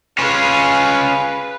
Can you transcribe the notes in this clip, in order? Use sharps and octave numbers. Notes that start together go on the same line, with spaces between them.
C#4 F4 G#4 B4 F5